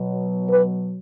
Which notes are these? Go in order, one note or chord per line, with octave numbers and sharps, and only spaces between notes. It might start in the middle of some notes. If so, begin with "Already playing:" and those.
Already playing: B2 F#3
B4